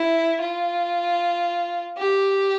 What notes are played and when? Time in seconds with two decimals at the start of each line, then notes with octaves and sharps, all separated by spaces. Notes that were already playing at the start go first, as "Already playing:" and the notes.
Already playing: E4
0.41 F4
1.99 G4